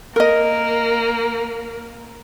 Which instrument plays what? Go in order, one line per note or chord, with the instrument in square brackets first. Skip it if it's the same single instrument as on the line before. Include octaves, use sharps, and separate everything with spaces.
[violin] A#3 [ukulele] A#4 D#5